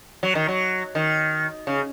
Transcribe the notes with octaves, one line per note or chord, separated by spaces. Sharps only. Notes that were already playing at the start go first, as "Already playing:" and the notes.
F#3
D#3
F#3
D#3
C#3